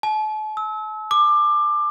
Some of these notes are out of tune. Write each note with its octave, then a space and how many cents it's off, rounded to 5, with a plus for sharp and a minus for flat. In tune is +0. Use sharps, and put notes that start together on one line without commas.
A5 -40
E6 -35
D6 +20